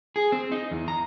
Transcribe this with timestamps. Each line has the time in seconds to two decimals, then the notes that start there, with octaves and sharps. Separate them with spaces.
0.16 G#4
0.32 C4
0.52 D#4
0.71 E2
0.88 A#5